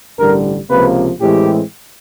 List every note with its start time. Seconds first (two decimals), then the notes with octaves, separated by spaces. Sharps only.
0.18 A1 G2 D3 G3 A#4
0.70 C#2 C3 F3 A#3 B4
1.21 A2 E3 G#3 C4 G4